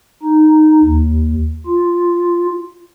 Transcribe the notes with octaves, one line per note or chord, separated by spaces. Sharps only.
D#4
D#2
F4